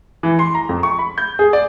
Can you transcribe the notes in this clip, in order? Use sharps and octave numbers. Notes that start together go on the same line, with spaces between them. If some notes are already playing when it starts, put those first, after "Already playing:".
E3
C6
A#5
F2
C#6
B5
G6
G#4
D5